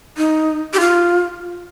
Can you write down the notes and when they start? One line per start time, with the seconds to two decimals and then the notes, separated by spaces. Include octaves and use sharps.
0.17 D#4
0.74 G4
0.80 F4